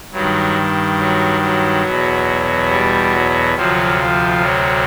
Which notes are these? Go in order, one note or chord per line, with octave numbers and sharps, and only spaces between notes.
G2 D#3 F#3
F#3
F#3
E2 B2
G3
F#3
D2 C3 F3 F#3
F3
F#3